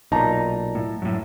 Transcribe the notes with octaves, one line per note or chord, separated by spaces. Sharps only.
B1 A#2 D#4 A5 A#5
A2
F#2 A2